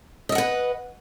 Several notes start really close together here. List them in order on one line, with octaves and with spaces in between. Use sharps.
D#5 E5 F#5 B4